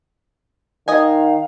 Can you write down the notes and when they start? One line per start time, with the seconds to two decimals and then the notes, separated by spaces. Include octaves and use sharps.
0.88 D#3 D#5 F5 G#5